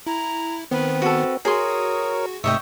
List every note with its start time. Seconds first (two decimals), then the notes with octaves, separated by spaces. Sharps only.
0.07 E4 A#5
0.71 D#3 B3 C4 B4
1.02 F#4 A4
1.45 F#4 G#4 A#4 C#5 C6 D#6
2.44 G#2 C3 A3 C#5 D#5 E5 G5 E6